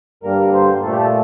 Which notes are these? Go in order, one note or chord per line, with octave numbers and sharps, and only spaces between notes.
G2 D3 G3 A#3 A#4
C5
A#2 A3 A4
G4
A4